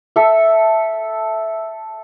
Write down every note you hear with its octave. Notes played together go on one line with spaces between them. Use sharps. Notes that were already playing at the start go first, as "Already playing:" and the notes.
A4 E5